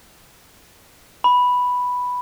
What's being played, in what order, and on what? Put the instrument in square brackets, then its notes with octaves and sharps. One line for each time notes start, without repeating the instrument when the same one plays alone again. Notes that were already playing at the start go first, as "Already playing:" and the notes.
[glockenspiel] B5